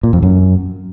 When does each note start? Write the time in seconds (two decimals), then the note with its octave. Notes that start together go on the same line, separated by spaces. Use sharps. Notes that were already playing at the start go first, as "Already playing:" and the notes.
0.03 A#2
0.13 F2
0.23 F#2